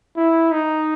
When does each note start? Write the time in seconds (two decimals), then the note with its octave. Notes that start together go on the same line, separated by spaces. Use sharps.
0.17 E4
0.52 D#4